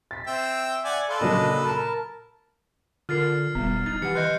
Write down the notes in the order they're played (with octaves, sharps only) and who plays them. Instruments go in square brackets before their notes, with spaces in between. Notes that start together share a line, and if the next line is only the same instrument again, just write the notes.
[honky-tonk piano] A6 B6
[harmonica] C4 G5 E6 [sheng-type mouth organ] E5
[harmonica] D5 F#5 G#5
[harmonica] A4 B4 [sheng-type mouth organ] D5 F5 C6
[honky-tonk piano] A#2 C#3 F#3 [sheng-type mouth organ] D4 D#5
[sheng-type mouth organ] A#4 A5 [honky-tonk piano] B5
[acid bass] D3 [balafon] F4 A#4 [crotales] F6 A6 C7
[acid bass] E1 [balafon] G3 B3
[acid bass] D#4 [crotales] A6
[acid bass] E3 [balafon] G4 F#5 [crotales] C#7
[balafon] D#3 D#5 C6 [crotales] F#6 G6 A#6